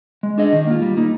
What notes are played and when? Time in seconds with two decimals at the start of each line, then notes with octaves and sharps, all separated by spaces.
0.23 G#3
0.38 D4 G#4 D#5
0.53 D#3
0.67 A#3 F4
0.82 G3
0.97 A#3 D#4